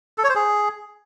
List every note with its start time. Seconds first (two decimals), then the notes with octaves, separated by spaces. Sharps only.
0.18 A4
0.24 C#5
0.30 C5
0.35 G#4